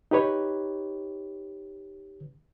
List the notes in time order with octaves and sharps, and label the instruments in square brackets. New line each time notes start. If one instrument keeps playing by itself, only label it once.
[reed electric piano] D#4 G4 B4 C#5